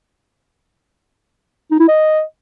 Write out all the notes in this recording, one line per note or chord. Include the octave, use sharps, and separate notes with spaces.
D#4
E4
D#5